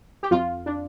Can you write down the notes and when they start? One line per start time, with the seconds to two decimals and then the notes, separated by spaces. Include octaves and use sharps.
0.23 G4
0.31 F2 F4
0.66 D4